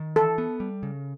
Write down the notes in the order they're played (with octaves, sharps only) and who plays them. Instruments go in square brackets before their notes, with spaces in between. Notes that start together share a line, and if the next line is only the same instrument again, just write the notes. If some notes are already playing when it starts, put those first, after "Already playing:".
Already playing: [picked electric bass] D#3
[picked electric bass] E3 [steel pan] A4
[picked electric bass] B3
G3
C#3